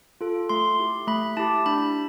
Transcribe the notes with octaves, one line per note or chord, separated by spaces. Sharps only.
F4 A4
A3 C6
E4 G4
A3 B5
E4 G4 A5
D4 B5